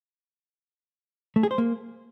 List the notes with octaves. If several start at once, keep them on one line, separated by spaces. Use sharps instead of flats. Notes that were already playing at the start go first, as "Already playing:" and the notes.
A3
G#4
C5
A#3